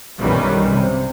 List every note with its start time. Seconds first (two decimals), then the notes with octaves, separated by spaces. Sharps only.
0.19 B1 G2 D#3 E3 G3 C#4
0.70 C3